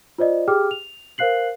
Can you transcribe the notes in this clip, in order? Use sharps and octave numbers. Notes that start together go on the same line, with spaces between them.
F4 C5 D5 D#5
G4 G#4 G5 D6 F6
F7
A#4 C5 F5 F#6 C7 F#7